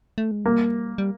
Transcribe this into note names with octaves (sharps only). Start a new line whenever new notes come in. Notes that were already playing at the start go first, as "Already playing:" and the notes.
A3
G#3
G3 A#3
G3